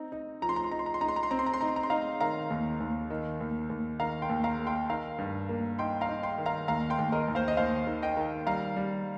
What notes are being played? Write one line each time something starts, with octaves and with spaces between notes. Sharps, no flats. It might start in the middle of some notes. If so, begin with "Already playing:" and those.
Already playing: C4 D#4 A#5
D#4
F3 A#5
C6
A#5
C6
D#4 A#5
C6
A#5
C6
D#4 A#5
C6
A#5
C6
C4 A#5
C6
A#5
C6
D#4 A#5
C6
A#5
C6
D#4 F5 A#5
D#3 F5 A#5
D#2
D#2
D#3
D#2
D#2
D#3 F5 A#5
G5 C6
D#2
F5 A#5
A#3
G5 C6
D#3 F5 A#5
G2
A#3
D#4 G5 C6
F5 A#5
D#4
G5 C6
D#3
F5 A#5
D#2 F5 A#5
G5 C6
D#2
A#4 D#5
D#2
C5 F5
D#5
D#2 C5 F5
D#3
D#5 G5
D#3
G3 F5 A#5
G3